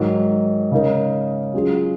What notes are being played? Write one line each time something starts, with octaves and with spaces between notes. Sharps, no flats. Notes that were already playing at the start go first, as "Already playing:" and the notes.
Already playing: G#2 D#3 F#3
C#3 G#3 D#4 A#4
F#3 C#4 F4 G#4